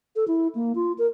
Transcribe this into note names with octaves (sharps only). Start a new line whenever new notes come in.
A4
E4
A#3
F4
A#4